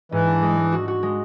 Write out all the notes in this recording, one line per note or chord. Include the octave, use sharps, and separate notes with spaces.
G#2 E3
D4
G#3
G#3
F#4
F#4
G#3